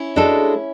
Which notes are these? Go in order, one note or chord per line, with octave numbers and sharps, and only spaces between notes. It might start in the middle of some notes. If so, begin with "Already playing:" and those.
Already playing: C#4 E4
G#3 D4 F#4 A4